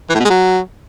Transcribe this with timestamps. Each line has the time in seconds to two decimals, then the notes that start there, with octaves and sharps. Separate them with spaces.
0.10 E3
0.15 A2
0.20 B2
0.25 G#3
0.30 F#3